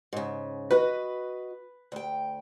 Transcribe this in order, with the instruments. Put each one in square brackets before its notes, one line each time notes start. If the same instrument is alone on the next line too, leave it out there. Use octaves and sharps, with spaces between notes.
[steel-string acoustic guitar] G#2 C#3
[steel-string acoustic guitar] F#4 D#5 [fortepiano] B4
[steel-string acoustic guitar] D2 G5